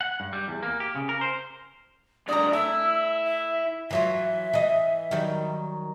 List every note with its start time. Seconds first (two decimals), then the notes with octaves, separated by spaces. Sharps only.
0.01 F#5
0.20 G2
0.33 G3
0.48 E2
0.63 A#3
0.80 G4
0.95 C#3
1.09 A#4
1.21 C5
2.29 B1 D3 D5 A#5 D#6
2.53 A3 E4 E6
3.25 E5
3.91 E3 F#3 F4 E5
4.53 E3 D#5
5.11 D#3 F#3 G3